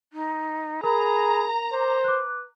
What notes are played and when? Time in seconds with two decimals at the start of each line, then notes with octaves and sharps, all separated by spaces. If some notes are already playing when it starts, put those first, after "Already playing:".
0.13 D#4
0.84 G#4 A#4 A#5 B5
1.73 C5 D6
2.04 B4 D6 F#6